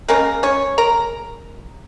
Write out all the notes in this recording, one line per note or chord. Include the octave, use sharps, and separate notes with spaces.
C#3 G#3 A#3 C#4 A#4
C#4 C#5
A#4 A#5